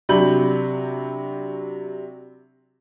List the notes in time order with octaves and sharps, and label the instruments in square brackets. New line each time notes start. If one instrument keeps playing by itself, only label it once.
[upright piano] C3 F#3 D4 B5 G6 F#7